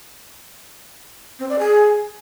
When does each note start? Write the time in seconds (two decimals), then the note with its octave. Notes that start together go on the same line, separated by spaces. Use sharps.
1.39 C4
1.49 D5
1.59 G#4